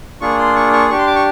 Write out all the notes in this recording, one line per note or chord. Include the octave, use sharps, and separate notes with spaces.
A#3 D4 F4 G#4 C#6
C6
C#6
C#6
D4 G4 C#6
C6
D6
C#6